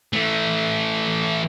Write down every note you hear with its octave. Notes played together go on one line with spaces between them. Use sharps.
E3 A3